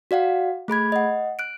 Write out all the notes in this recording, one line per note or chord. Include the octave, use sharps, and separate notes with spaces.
F#4 D5 F5 F#5
A3 G#4 B5 G#6
D#5 F#5
F#6 D7